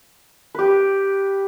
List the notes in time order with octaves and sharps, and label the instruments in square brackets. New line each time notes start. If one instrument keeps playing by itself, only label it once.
[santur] G4 B4